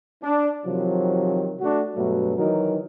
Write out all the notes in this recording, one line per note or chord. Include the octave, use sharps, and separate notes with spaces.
D4
C3 D#3 F3 F#3
A3 D4 F#4
G2 B2 F#3 A3
D#3 E3 F#3 D#4 A#4